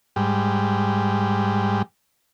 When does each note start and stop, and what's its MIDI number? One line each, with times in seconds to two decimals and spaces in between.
0.16 1.82 44
0.16 1.82 55